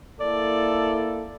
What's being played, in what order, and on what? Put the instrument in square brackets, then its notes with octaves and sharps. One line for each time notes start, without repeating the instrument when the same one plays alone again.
[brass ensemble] A#3 E4 A4 [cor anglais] D5